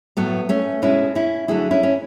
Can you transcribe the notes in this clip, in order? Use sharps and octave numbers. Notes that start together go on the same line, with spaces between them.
A2 F#3 A3 B3
A3 C#4
B2 G#3 C#4 E4
C#4 E4
D3 F#3 A3 E4 G#4
C#4 E4
C#4